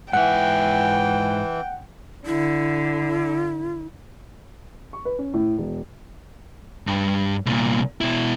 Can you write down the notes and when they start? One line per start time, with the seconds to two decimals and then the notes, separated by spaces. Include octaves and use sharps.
0.13 G#2 E3 E5 F#5 G5
2.26 D3 E4
4.93 C#6
5.05 B4
5.19 C#4
5.34 A2
5.58 E1
6.87 G2
7.46 C2 A#2
8.01 B2 E4